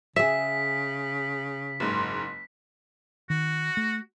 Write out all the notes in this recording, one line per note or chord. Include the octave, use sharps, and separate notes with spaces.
C#3 G#4 E5 B6
F#1 G#2
D#3 F#4
A3